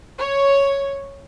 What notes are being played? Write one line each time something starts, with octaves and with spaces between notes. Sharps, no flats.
C#5